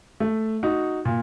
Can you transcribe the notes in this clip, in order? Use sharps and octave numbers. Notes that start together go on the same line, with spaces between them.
A3
D#4 F#4
A#2